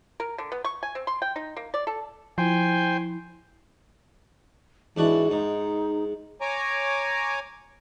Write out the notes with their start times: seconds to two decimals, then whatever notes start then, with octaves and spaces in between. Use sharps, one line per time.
0.20 A#4
0.38 D3
0.52 B3
0.64 C#6
0.83 G#5
0.95 C4
1.07 C6
1.22 G5
1.36 D#4
1.57 A#3
1.74 D5
1.87 A4
2.38 F3 E4 C5 G5 G#5
4.97 G#2 E3 D4 F#4
5.31 G#2 D#4
6.41 C#5 G#5 A#5 D6